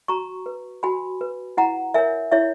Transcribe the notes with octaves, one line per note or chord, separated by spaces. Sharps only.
F#4 A#5 C#6
B4
F#4 G#5 B5
B4
E4 F#5 A#5
A#4 C#5 E5 G#5
E4 C#5 E5